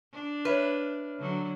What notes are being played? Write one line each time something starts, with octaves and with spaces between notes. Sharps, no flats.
D4
B4 C#5 E5 F6
D3 F#3